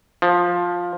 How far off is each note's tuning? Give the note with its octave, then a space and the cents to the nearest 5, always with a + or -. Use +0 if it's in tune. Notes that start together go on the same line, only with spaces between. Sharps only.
F3 +10